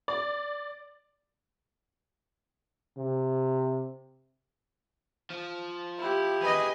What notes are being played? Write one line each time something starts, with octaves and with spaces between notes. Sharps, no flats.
D5
C3
F3
E4 G4
G#4 B4 D#5